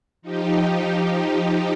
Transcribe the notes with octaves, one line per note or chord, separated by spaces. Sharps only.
F3 D#4 G4